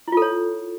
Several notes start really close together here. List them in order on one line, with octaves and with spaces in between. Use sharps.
E4 F4 A4 C#5